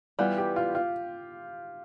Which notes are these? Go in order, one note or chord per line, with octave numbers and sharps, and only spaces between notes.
E3 G3 B3 F4
G4
F4
F4